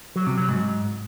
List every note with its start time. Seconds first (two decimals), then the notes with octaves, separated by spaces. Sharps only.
0.16 F#3
0.27 C3
0.38 F#3
0.49 G#2